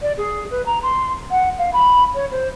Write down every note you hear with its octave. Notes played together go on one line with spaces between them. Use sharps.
D5
G#4
B4
A#5
C6
F#5
F5
B5
C#5
C5